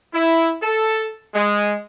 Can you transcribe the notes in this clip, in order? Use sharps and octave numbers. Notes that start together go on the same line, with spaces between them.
E4
A4
G#3